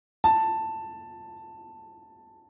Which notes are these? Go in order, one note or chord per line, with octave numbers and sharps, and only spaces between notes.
A5